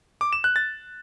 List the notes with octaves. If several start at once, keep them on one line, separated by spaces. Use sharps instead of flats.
D6
E7
F#6
A6